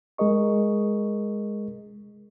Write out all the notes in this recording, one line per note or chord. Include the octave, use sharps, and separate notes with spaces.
G#3 G#4 A#4 D#5 C#6